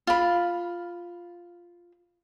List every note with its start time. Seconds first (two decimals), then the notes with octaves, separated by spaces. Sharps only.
0.07 F4 B5